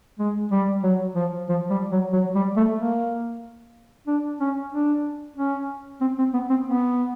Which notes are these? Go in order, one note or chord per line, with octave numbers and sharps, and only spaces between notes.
G#3
G3
F#3
F3
F3
G3
F#3
F#3
G3
A3
A#3
D4
C#4
D4
C#4
C4
C4
B3
C4
B3